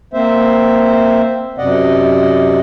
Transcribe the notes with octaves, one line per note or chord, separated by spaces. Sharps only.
A#3 C4 C5 E5
F#2 C3 D5 D#5 F#5